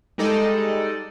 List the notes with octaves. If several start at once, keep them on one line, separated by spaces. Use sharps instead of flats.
G3 G#3 D#4 A4 D5 D#5